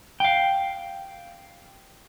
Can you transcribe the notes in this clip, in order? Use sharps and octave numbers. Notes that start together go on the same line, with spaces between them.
F5 G5